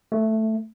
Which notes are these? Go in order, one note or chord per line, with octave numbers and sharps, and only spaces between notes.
A3